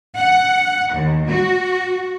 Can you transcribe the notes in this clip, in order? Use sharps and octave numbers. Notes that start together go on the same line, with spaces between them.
F#5
D#2
F#4